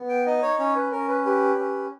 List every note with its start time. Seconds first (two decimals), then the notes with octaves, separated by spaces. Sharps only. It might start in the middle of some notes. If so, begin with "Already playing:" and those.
Already playing: B3
0.09 G5
0.26 D#4 D#5
0.42 C#5
0.59 C#4 C#5
0.75 B4
0.91 C#4 A#4
1.08 B4
1.25 G4 B4
1.58 C#4